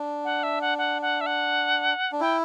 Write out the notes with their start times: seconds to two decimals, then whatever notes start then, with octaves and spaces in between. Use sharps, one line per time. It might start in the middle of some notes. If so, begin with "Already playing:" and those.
Already playing: D4
0.25 F#5
0.43 E5
0.61 F#5
0.78 F#5
1.02 F#5
1.21 E5
1.26 F#5
2.12 D4
2.21 E4 G5